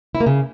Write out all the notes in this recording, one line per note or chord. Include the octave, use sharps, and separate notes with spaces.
E4
A#3
C#3